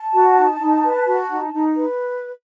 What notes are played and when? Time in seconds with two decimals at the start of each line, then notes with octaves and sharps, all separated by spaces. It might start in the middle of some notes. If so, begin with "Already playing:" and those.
Already playing: A5
0.14 F#4
0.37 D#4
0.60 D#4
0.84 B4
1.07 F#4
1.30 D#4
1.53 D#4
1.76 B4